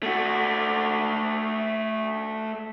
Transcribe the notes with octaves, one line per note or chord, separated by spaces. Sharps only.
A3 F#4